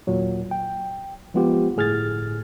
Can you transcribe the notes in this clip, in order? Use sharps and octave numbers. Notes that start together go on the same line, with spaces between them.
D#2 A#2 F#3
G5
F3 G#3 B3 F4 G4
G1 A2 G#4 F6 G#6 A6